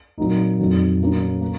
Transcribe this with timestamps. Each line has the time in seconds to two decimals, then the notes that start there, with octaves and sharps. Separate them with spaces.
0.18 A#2 F#3 C4 D#4
0.59 F2 D#3 F#3
1.00 A#2 F#3 A#3 C#4
1.41 A#3